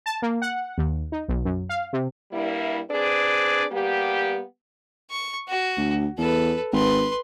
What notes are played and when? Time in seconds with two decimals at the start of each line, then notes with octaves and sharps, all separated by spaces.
0.06 A5
0.22 A#3
0.42 F#5
0.78 D#2
1.12 D#4
1.28 B1
1.45 F#2
1.69 F5
1.93 C3
2.32 G2 G3 A#3 E4
2.90 C4 D4 G#4 B4 D5
3.71 G3 A#3 B3 G4
5.11 C#6
5.48 F#4
5.78 D2
6.18 E2 A4 B4
6.73 G#1 B4 C6